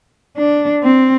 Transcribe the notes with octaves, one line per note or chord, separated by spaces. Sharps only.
D4
C4